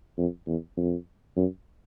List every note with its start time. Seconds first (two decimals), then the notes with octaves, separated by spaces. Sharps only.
0.18 F2
0.47 E2
0.76 F2
1.36 F#2